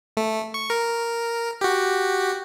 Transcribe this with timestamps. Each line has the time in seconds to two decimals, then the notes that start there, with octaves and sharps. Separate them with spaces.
0.17 A3
0.54 C#6
0.70 A#4
1.61 F#4 G4